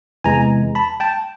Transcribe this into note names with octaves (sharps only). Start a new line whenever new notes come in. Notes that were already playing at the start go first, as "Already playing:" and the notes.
E2 C3 E3 G#3 G#5 A#5
A5 B5
G5 A5